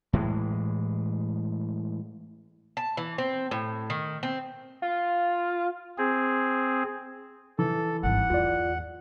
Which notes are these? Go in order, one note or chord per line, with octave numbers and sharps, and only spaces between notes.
A2 E3 G#3
A5
E3
C4
A2
D#3
C4
F4
C4 G#4
E3 A4
G#1 G2 F#5
E2 F4 D5